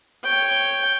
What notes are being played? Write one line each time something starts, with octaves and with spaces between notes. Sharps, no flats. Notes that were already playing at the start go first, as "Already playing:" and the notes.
C#5 G5